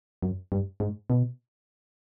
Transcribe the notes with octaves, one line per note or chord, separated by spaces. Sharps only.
F#2
G2
G#2
B2